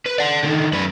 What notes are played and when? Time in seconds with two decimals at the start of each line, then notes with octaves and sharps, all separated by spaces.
0.06 B4
0.18 D5 F#5
0.43 D3 D#3
0.73 F#2 B4